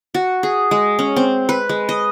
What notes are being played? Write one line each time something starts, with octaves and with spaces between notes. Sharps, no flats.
F#4
G#4
G#3
C#4
C4
B4
G#3
D#5